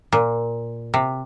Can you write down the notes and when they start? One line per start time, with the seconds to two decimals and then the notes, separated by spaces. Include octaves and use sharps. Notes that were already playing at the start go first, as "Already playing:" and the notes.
0.12 A#2
0.94 C3